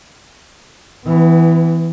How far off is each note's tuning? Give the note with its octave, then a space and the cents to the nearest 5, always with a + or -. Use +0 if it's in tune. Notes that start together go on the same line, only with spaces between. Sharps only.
E3 +0 B3 +30